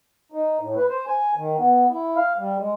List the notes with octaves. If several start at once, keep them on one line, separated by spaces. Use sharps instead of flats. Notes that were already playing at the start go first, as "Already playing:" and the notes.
D#4
A2
B4
C5
G#5
D#3
B3
E4
F5
G3
G#3